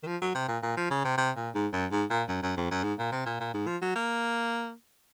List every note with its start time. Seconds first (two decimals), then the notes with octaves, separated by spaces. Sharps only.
0.03 D#3
0.07 F3
0.21 F#3
0.35 C3
0.48 A#2
0.63 A#2
0.77 F3
0.90 C#3
1.04 C3
1.17 C3
1.36 A#2
1.54 G#2
1.73 F#2
1.91 G#2
2.10 A#2
2.28 F#2
2.43 F#2
2.57 F2
2.71 F#2
2.84 G#2
2.99 A#2
3.12 C3
3.26 A#2
3.40 A#2
3.54 G#2
3.67 F3
3.82 F#3
3.95 A#3